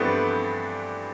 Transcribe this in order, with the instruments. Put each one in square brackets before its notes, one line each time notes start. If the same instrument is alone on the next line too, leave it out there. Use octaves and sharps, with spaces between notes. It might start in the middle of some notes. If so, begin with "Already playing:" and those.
Already playing: [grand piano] G2 E3 A3 B3 C4 D4